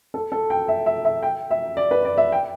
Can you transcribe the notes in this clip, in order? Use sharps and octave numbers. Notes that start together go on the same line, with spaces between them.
A4
A4
G5
E5
E5
E5
G5
E5
D5
B4
D5
E5
G5